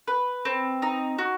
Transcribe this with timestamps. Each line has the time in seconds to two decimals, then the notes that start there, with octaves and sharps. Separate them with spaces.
0.08 B4
0.45 C4
0.82 D#4
1.18 F#4